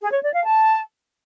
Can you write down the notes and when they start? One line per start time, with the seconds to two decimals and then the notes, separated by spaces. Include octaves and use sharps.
0.01 G#4
0.12 C#5
0.23 D5
0.33 F5
0.44 A5